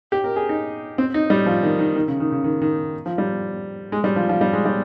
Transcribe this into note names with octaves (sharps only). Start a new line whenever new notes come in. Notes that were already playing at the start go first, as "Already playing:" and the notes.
G4
A#4
G#4
D#4
C4
D#4
G3
F3
D#3
D#3
D#3
C#3
D#3
C#3
D#3
D#3
F3
G3
G#3
G3
F3
F3
G3
G#3
G3